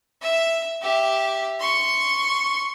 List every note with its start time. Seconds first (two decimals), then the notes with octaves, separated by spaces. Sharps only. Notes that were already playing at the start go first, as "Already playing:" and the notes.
0.21 E5
0.82 G4 E5
1.60 C6 C#6